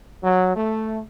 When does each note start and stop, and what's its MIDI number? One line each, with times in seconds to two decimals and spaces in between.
0.23 0.55 54
0.56 1.01 57